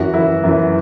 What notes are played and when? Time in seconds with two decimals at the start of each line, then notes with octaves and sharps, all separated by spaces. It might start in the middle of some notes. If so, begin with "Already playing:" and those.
Already playing: F#2 E3 F#4
0.14 F#2 E3 E4
0.44 F#2 E3